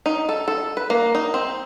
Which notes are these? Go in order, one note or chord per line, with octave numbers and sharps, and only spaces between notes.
D#4
A4
A4
B4
A#3
D#4
C4